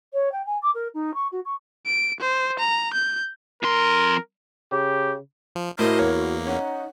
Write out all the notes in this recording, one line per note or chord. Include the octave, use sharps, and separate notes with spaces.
C#5
G5
G#5
D6
A#4
D#4
C#6
F#4
C#6
D7
C5
A#5
G6
F2 A#4 C6
C#3 G4
F3
A2 E4 F#4 A#4 C5 D#5
E2 A#3 C#5
C#4 D#4 F#5